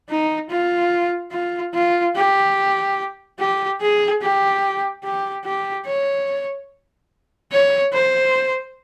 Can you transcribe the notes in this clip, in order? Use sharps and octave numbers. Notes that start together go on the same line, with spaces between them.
D#4
F4
F4
F4
G4
G4
G#4
G4
G4
G4
C#5
C#5
C5